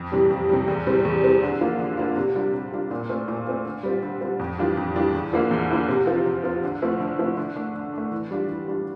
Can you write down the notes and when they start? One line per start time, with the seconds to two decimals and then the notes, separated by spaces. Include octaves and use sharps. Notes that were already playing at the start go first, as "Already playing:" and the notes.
Already playing: F2
0.12 C3 E3 G3
0.30 F2
0.49 C3 E3 G3
0.68 E2
0.87 C3 E3 G3 C4
1.05 E2
1.23 C3 E3 G3 C4
1.42 D3
1.60 F3 A#3 D4 F4
1.79 D3
1.97 F3 A#3 D4 F4
2.17 C3
2.35 G3 D4 F4
2.54 C3
2.72 G3 D4 F4
2.91 A#2
3.09 A3 C4 F4
3.28 A#2
3.46 A3 C4 F4
3.65 D3
3.83 G3 C4 F4
4.02 D3
4.21 G3 C4 F4
4.39 F2
4.58 E3 G3 D4 F4
4.77 F2
4.96 E3 G3 D4 F4
5.14 E2
5.33 D3 F3 A#3 E4
5.51 E2
5.70 D3 F3 A#3 E4
5.89 C3
6.07 F3 C4 F4
6.25 C3
6.44 F3 C4 F4
6.63 D3
6.82 F3 A3 C4 E4
7.00 D3
7.19 F3 A3 C4 E4
7.37 D3
7.56 A3 D4
7.75 D3
7.93 A3 D4
8.12 E3
8.31 G3 D4 F4
8.49 E3
8.68 G3 D4 F4